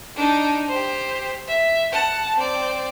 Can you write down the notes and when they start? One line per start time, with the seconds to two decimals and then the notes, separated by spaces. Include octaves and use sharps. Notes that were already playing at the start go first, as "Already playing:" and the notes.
0.16 D4 D#4
0.68 G4 C5
1.47 E5
1.92 F#5 A5
2.35 C4 D5